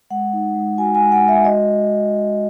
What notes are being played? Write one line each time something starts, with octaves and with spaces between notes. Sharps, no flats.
G#3 F#5
D#4
G#3
F#4 G#5
G#5
G#3
F#5
G#3
E5
F#4 D#5